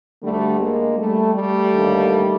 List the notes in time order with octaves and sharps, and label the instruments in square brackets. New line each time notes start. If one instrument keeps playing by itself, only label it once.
[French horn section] D2 D3 G3 A3
G#3 A#3
G3 A3
G3 A3
D#2 D3